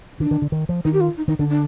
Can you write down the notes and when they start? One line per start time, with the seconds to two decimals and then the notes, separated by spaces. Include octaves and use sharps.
0.19 D#3 D4
0.31 D#3
0.42 D3
0.52 D#3
0.69 F3
0.85 D#3 D#4
0.93 G4
1.01 F4
1.17 D#4
1.28 D#3 D#4
1.39 D3 D4
1.50 D4